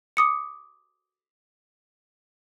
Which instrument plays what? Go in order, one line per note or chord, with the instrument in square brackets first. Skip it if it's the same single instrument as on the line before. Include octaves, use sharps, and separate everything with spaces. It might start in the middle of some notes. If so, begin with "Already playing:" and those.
[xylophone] D6 D#6 C#7